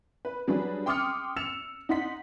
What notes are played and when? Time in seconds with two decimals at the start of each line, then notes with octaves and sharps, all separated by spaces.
0.25 B4
0.47 F#3 G3 D4 G#4 B4
0.86 G5 C6 D6 D#6 F6 C#7
1.36 E6 C#7 E7 F7
1.89 D#4 F#5 C6 B6